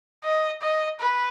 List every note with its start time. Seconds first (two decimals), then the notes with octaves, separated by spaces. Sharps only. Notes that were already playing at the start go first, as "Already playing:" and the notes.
0.24 D#5
0.62 D#5
1.00 B4